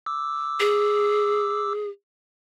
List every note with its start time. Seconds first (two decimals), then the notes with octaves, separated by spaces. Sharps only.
0.06 D6 E6
0.60 G#4